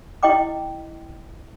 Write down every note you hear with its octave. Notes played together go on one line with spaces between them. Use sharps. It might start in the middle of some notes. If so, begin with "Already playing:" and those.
E4 D#5 G5 D6